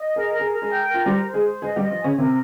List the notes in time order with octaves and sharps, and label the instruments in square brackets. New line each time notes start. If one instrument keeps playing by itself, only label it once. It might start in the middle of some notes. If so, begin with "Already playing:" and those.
Already playing: [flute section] D#5
[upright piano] G#4 [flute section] A#4
[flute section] A#4
[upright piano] G#4
[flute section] A#4
[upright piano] G#3 G#4
[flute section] G5
A#4
[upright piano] F4
[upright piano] G3 G4 [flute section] C5
[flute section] C5
[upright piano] G#3 G#4
[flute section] C5
[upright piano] G#3 G#4 [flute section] D#5
[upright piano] G3 G4
[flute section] D#5
[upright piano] F3 F4
[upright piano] C#3 C#4 [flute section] G#5
[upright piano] C3 C4 [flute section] A#4